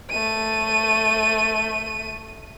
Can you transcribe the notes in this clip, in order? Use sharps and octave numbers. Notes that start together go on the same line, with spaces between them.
A3 D#7